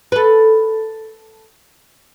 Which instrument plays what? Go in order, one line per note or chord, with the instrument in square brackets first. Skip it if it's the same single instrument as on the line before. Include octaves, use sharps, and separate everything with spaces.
[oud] A4 B4